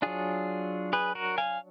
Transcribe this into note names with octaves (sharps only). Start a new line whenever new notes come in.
F#3 D4 F4 G#4
G#4 B4
F#4 A#4
F5 G#5